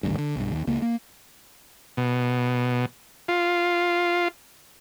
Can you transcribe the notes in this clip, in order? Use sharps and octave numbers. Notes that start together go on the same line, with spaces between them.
G#1 D2 G2
D3
B1 G2
D#2
C#2 A#3
A#3
B2
F4